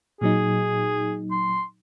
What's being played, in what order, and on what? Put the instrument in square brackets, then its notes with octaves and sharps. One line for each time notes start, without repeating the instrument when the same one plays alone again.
[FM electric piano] A#2 F#3 D#4 [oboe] G#4
[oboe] C6